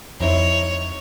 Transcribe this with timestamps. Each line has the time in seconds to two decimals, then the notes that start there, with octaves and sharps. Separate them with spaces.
0.21 F2 D#4 E4 C5 C#5